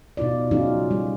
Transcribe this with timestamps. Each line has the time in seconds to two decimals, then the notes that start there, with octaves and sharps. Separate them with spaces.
0.17 B2 D#4 F4 D5
0.51 F#3 C#4 D#4 F4 G#4
0.91 G3